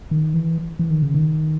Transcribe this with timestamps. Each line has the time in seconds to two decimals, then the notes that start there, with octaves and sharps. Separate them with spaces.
0.11 D#3
0.34 E3
0.79 E3
0.90 D#3
1.02 C#3
1.14 D#3